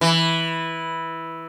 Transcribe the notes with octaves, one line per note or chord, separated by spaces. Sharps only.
E3